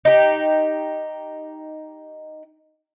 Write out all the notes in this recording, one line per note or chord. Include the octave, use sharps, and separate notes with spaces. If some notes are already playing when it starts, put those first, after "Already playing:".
D#4 G4